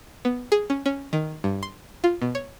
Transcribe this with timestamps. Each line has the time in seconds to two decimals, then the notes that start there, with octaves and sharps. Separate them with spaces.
0.25 B3
0.52 G#4
0.70 C#4
0.86 C#4
1.13 D#3
1.44 G2
1.63 C6
2.04 F4
2.22 B2
2.35 C#5